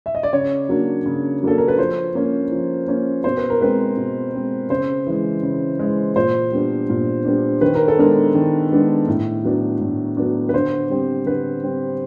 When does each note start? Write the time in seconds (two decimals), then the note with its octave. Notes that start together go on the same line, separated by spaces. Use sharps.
0.06 E5
0.15 D#5
0.23 D5
0.33 C#3 C#5
0.69 F#3 A#3 D4
1.06 C#3
1.43 F#3 A#3 D4 A4
1.58 A#4
1.68 B4
1.78 F3 C5
2.15 A#3 C#4
2.52 F3
2.88 A#3 C#4
3.24 B2 C5
3.37 B4
3.50 A#4
3.61 G#3 C4 B4
3.97 B2
4.34 G#3 C4
4.70 C#3 C5
5.07 E3 G#3
5.43 C#3
5.79 E3 G#3
6.16 A#2 C5
6.52 G3 B3 D4
6.90 A#2
7.25 G3 B3 D4
7.61 D#3 B4
7.75 A#4
7.88 A4
7.98 G#3 B3 D4 A#4
8.35 D#3
8.72 G#3 B3 D4
9.08 A2
9.44 F#3 B3 D4
9.80 A2
10.17 F#3 B3 D4
10.49 B4
10.54 D3 C5
10.90 G3 C4
11.26 D3 B4
11.63 G3 C4